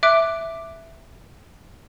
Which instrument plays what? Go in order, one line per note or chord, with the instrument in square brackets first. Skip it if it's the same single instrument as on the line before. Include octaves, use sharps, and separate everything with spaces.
[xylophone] E5 D6 F#6 D7